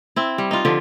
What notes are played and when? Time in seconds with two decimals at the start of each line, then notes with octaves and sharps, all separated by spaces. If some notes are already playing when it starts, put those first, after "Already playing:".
0.16 C4 E4
0.38 G3
0.51 D#4 F4
0.65 D3 F3 G4